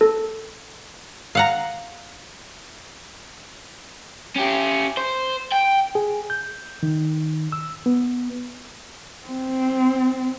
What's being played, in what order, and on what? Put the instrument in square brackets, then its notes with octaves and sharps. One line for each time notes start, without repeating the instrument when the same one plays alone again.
[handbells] A4
[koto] F5 F#5 A#5
[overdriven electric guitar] C#4 G4
C5
G5
[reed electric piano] G#4
G6
D#3
E6
B3
[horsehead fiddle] C4